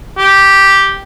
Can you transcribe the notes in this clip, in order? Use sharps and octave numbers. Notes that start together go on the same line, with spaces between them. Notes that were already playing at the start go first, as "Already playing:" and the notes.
G4